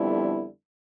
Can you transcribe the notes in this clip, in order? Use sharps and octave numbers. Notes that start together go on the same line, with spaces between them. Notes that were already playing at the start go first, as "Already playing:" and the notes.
Already playing: F2 D3 G3 B3 E4